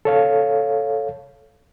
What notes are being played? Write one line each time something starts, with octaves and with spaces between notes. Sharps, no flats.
A4 C#5 F5